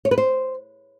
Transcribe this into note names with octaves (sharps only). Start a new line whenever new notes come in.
C#5
B4
C5